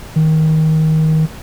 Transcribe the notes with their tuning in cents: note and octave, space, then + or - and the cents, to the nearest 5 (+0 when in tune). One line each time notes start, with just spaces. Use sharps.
D#3 +20